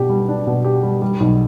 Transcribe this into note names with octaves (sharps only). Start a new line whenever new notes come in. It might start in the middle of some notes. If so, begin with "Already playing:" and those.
Already playing: B2 D4 G4
G3
D4
B2
G4
G3
G3
B1